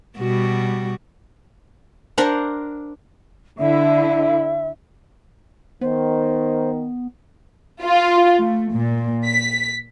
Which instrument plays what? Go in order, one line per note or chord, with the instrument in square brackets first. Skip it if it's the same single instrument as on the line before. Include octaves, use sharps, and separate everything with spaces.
[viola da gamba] B2 G3 F#4
[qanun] D4 A#4 C5 F#5
[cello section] D3 E4 [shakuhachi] E5
[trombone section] D#3 [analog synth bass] B3 [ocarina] C5
[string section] F4
A3
A#2
B6